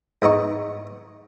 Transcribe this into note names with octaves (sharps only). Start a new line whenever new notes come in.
G#2 B3 D#4 C#6